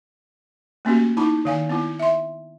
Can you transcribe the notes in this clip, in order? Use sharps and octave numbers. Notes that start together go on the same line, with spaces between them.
A3 A#3 C#4 F#4 G4
D#4 E4 A5 B5
D#3 F5 G#5
B3 E4
E5 C6